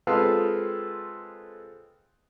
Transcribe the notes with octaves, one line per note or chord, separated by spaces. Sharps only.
G#3 C4 F4 A4 B4 F5